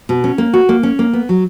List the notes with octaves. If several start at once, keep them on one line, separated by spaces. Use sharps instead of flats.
B2
C#4
A#3
F#4
A#3
C#4
A#3
B3
F#3